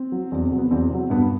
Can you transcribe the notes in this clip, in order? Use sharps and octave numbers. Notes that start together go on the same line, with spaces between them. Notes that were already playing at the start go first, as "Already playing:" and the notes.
Already playing: C4
F#3
E2 C4
C4
C3 F#3
B3
E2 C4
C3 F#3
G2 B3